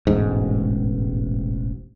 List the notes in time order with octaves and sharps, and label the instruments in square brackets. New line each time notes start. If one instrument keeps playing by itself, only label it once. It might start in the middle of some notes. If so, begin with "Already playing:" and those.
[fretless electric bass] E1 A1 G#2